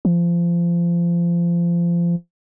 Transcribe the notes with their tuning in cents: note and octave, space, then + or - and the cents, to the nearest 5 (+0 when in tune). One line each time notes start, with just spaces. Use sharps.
F3 -25